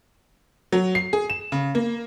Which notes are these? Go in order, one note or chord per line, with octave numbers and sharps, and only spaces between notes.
F#3
C7
G#4
E7
C#3
A#3